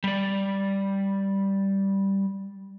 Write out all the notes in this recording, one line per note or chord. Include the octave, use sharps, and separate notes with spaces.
G3 D5